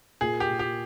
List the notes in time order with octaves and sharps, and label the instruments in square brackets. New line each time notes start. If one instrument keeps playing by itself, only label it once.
[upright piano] A#2 [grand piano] G#4
[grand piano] G4
[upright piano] A#2
[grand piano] G4